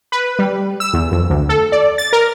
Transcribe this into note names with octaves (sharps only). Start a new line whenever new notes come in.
B4
G3
E6
E2
F2
D2
A4
D5
A6
A#4